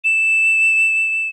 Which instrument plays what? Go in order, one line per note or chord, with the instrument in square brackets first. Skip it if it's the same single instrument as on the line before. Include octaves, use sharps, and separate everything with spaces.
[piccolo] E7